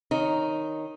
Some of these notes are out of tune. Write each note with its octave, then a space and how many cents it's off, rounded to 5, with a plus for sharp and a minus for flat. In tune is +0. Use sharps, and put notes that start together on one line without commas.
D#3 +0 D#4 +0 C#5 +0